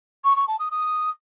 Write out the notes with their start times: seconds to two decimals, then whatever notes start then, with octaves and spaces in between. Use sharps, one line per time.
0.24 C#6
0.36 C#6
0.48 A5
0.59 D#6
0.71 D#6